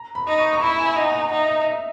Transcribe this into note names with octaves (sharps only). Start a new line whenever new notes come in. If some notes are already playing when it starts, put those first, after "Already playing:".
Already playing: A#5
B5
D#4
C#6
C#6
E4 B5
G#5
D#4 F#5
F#5
D#4 E5
D#5
E5